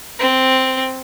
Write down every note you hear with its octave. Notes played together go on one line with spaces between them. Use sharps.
C4